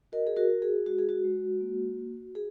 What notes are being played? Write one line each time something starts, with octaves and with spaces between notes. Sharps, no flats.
F#4 A#4 D#5
G#4
F#4 A#4
F#4
G#4
G#3 F#4
G#4
F#4
G#3
A#3
F#4
G#4